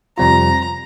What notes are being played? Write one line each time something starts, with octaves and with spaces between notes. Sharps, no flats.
F2 C3 G3 C4 F4 A#5